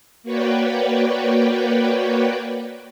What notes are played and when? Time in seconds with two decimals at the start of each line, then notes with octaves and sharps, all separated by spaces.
0.23 A#3 F#4 B4 C#5 D5 G5